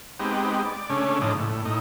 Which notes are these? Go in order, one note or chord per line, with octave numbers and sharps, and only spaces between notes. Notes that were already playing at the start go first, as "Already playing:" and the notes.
G#3 B3 C4 D#4 G4
D5
C#3 A3 C#4 D4
A2 C#3 F3 D4 D#4
A2
A2 D#4